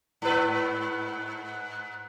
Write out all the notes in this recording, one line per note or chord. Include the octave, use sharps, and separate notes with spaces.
G#2 B4